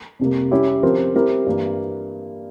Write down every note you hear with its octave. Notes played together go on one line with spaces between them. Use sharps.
F2 C3 G3 A#3
G3 C#4 E4 G4 C#5
F3 C4 G4 A#4
G3 C4 E4 G4 A#4
G2 E3 A#3